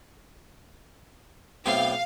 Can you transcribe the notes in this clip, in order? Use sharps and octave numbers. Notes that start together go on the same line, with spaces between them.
B1 A2 C4 F5